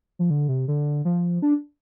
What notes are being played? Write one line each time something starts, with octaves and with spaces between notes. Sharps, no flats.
F3
D3
C3
D3
F3
D4